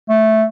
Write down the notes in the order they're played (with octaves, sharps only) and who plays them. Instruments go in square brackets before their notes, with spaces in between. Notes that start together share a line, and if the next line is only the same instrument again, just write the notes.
[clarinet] A3